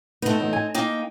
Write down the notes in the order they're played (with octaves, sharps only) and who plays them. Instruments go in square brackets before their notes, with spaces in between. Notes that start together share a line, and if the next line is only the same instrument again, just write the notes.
[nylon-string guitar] A3 B3 [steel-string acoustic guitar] C4 D#4
[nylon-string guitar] E2
G#5
[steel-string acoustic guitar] A#3 D#4 G5